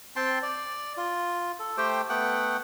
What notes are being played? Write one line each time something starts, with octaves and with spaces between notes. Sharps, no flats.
C4 G5 A5 C6
D5
F4
A4
A3 G4 C5 G5
A3 B3 F#5 G5